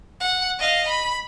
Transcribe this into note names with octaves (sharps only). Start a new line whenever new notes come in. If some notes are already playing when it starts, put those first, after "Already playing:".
F#5
D#5 F5
B5